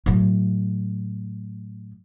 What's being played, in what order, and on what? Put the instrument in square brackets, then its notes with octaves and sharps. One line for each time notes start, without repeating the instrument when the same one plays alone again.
[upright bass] A2 F#3